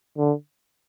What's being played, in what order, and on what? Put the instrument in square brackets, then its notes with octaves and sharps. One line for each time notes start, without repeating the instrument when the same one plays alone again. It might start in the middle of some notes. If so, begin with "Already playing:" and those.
[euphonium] D3